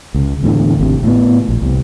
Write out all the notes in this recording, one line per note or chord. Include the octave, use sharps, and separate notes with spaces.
C#2
E2 A2 D3
G#1 C3
A2 B3
A#1
C2